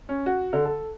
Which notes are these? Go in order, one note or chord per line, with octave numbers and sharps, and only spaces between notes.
C#4
F#4
D3
A4